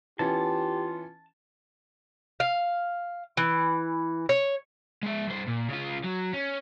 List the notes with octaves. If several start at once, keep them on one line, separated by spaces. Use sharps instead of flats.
E3 B3 C#4 F4 G4 A5
F5
E3
C#5
G#3 E5
G2 C5
A#2
C#3 F4
F#3
C#4